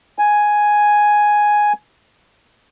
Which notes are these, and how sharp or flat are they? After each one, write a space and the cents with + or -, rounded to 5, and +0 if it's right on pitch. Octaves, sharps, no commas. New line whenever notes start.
G#5 +5